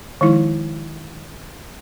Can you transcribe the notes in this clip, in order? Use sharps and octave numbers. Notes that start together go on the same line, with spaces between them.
D#3 F3 G#3 D#4 E4